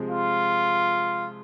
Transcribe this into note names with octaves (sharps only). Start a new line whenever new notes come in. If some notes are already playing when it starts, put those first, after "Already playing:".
Already playing: C3 F3 G#3 C4
F4